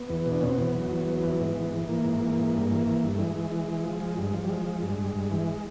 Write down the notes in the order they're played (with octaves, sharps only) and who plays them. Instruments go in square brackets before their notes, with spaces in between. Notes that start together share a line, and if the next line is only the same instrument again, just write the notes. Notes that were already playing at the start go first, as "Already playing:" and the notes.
Already playing: [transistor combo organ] B3
E2
B2
D4
B2 C#4
C4
E2 B3
F#3
E2
F#3
E3
G#2
E3
E3
E3 A#3
G#2
E3
G#2
G2
E3
E3
G2
A3
E3 G#3
E3
E3
E3
F3
F3
G2
F3
G3
F3 G#3
F3
G2
G2
G2
E3